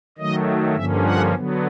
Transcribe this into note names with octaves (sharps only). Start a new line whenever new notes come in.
D#3 F#3 A3 D#5
G2 D3 F3 A#3 C#4 E5
F#5
D3 F#3 B3